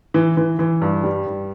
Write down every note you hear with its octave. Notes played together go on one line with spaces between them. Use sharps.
E3
E3
E3
G2
G3
G2